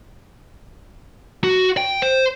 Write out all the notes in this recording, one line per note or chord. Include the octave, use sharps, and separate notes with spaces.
F#4
G5
C5